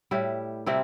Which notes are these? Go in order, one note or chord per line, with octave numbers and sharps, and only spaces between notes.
A2 G3 E4 G4
C3 G3 C4 E4